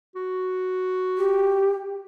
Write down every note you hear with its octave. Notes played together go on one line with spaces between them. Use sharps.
F#4
G4